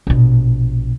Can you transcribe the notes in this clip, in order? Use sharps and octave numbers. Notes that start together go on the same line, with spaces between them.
A#1 B2